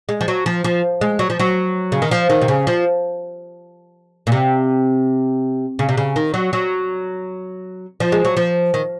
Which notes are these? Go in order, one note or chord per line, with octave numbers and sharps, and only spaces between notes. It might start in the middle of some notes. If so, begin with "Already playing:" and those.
G#3
F3
F#3
F3
F3
G#3
F#3
F3
F#3
C#3
D#3
F3
D#3
C3
C#3
F3
A#2
C3
C#3
C3
C#3
D#3
F#3
F#3
F3
G#3
F#3
F3
D#3